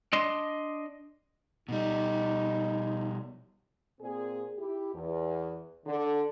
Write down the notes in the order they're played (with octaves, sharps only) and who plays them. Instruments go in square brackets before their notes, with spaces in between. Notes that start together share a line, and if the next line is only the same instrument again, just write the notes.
[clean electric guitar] D4 D#5 C6
[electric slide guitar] B2 G3 [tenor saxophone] D#4
[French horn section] A#2 C4 G#4
E4 G4
E2
D3